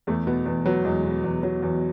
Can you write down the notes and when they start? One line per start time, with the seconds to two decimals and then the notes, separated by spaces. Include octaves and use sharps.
0.07 E2 A3
0.27 B2 B3
0.46 E2 B3
0.66 F#3 B3
0.85 E2 G#3
1.04 B2
1.24 E2
1.43 F#3
1.62 E2